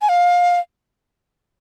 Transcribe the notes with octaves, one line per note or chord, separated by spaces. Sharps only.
G#5
F5